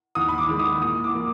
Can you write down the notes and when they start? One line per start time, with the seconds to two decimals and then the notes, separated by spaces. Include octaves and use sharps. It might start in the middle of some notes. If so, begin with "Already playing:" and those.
0.15 D#2 D#6
0.28 B5
0.38 D6
0.49 D#3 G#3
0.59 D#6
0.81 A#2 D#6
1.04 D6
1.14 F3 A#3